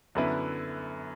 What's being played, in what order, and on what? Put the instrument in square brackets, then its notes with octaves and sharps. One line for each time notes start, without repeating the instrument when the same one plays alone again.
[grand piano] F#2 D3 B3 E4 B4